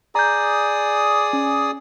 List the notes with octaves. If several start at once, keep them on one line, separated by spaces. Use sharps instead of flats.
G#4 D5 A#5 D#6 G6
C#4